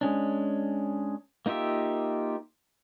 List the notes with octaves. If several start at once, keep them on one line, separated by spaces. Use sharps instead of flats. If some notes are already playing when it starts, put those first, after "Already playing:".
G#3 C#4 D4
A#3 D#4 F4 G4 E5